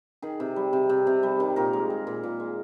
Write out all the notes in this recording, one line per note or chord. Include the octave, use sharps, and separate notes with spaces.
D#3 G#4
C3
G3
C3
C3
C3
G3
D#3
A#2 A#4
G#3
G#3
A#2
A#2
G#3